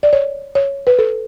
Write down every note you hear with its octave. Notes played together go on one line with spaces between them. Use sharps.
D5
C#5
C#5
B4
A4